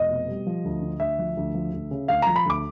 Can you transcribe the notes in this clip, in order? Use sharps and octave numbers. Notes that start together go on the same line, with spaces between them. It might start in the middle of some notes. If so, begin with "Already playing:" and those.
Already playing: F1 D#5
B2
G3
F3
D2
D3
D2 E5
F3
D2
F3
D2
C#3
D2 F5
F3 A#5
B5
D2 D6